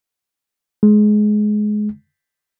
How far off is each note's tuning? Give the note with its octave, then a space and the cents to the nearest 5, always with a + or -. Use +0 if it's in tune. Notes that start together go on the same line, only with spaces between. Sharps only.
G#3 +20